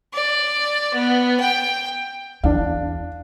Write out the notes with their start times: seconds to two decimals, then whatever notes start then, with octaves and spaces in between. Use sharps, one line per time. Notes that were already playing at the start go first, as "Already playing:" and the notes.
0.14 D5
0.94 B3
1.40 G5
2.44 E2 D4 F5